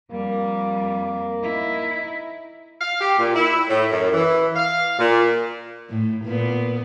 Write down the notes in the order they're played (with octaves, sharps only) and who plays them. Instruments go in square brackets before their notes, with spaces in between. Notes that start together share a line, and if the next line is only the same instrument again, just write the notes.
[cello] F2 G3 [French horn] A#3
[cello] D#4 E4
[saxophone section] F5
G4
A#2
E4
A2
F#2
E3
F5
A#2
[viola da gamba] A2
A#2 B3